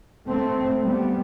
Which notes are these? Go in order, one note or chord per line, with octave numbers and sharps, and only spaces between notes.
A3 C4
G3 B3